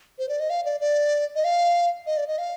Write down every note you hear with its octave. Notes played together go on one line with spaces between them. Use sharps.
C5
D5
D#5
F5
D5
D5
D#5
F5
D#5
D5
D#5
F5